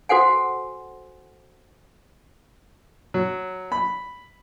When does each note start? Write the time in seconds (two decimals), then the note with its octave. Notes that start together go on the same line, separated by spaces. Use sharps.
0.09 F#4 A4 C5 F#5 G#5
3.14 F#3
3.72 B5